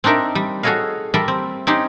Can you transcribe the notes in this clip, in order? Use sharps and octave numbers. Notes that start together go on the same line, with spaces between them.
C4 D4 D#4 A#4 E5
G3
F#4 G#4 A4 C#5 D#5 F5
G3 A#4 E5 A5 C6
C4
C4 C#4 D#4 G4 C6